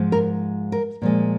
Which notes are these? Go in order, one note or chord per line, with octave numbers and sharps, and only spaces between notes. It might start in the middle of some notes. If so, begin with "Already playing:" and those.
Already playing: G#2 F3 G#3
A#4
A#4
A#2 F3 G#3